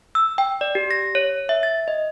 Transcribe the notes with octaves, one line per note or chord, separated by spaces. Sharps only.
E6
G5
D5
G4
A#6
C#5
E5
A6
D#5